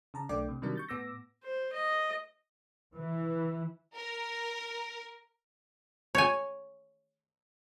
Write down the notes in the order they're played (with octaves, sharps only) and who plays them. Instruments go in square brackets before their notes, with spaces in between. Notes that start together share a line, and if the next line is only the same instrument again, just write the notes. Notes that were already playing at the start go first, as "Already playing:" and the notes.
[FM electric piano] C#3 A5 A#5
B1 A3 D4 D5 G5 D6
C3
C3 D#3 F#3 G3 D4 A#4
C#6 G6 A6
A2 B3 D6 E6 A#6
[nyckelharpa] C5
D#5
[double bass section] E3
[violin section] A#4
[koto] C#5 G#5